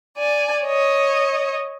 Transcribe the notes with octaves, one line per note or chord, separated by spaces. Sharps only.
D5 G#5
C#5 D#5